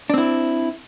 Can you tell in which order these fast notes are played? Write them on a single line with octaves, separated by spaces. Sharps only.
D4 C4 E4